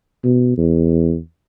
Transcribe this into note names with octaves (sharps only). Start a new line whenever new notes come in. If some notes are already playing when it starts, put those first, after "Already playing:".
B2
E2